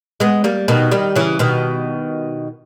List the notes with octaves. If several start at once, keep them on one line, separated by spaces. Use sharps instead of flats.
G#3 B3
G3 A#3
B2 D#3
D#3 G3
C#3 E3
B2 D#3